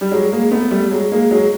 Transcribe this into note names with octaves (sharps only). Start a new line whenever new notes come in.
G3
F#3 G#3
G#3 A#3
A3 B3
G3 A3
F#3 G#3
G#3 A#3
F#3 G#3